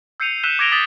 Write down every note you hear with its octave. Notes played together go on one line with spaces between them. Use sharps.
E6 G6 C7 C#7 D#7 F7
E6 F#6 B6 D#7 E7 G7
D6 G#6 A#6 D7 F7 G7
D6 D#6 A6 B6 F#7 G7